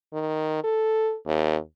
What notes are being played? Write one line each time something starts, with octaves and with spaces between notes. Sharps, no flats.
D#3
A4
D#2